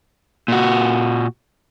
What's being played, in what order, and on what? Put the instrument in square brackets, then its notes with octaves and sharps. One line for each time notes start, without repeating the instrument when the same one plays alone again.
[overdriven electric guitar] A#2 F#4